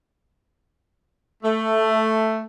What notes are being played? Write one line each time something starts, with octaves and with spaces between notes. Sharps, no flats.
A3